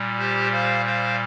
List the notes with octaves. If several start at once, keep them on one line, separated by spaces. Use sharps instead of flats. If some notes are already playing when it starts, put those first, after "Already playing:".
Already playing: A#2 G3
G4 C5
C5 F5
C5 F5